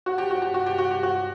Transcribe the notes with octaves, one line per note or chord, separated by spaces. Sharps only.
F#4
G4
F#4
G4
F#4
G4
F#4
G4
F#4